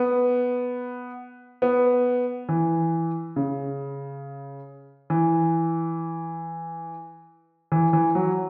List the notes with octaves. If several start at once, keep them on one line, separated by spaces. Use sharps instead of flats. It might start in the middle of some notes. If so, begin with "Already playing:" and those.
Already playing: B3
B3
E3
C#3
E3
E3
E3
F#3